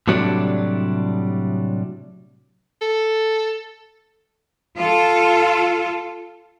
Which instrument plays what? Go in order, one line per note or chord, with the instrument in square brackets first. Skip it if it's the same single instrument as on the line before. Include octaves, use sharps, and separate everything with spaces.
[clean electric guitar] A2 C3 F#3 G3 C#4 D4
[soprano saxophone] A4
[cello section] F4 A4